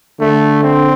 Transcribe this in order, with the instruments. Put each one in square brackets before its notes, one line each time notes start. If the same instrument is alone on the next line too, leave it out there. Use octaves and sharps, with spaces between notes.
[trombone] D3 [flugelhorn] A3
[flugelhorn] C4